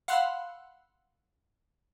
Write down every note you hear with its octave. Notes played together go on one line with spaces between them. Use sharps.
F5 F#5 B5 C6 E6 F#6